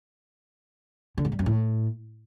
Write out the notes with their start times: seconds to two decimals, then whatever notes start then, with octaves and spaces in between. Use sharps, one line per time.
1.18 D3
1.25 G#2
1.32 G2
1.39 F#2
1.46 A2